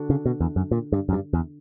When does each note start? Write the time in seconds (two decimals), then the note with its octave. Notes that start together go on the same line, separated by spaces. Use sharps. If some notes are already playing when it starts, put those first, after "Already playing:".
Already playing: D3 D4 F#4
0.10 C#3
0.26 B2
0.41 E2
0.56 F#2
0.71 A#2
0.92 G2
1.09 F#2
1.13 G2
1.33 E2